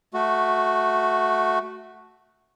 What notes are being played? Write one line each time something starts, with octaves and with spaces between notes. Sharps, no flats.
A3 F#4